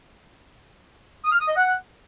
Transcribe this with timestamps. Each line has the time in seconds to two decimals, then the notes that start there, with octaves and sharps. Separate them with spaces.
1.24 D#6
1.32 F6
1.40 D#6
1.48 D#5
1.56 F#5